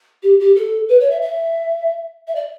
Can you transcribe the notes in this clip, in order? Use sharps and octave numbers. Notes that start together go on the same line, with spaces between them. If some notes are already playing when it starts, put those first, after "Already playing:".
G4
G4
A4
B4
C#5
E5
E5
E5
D5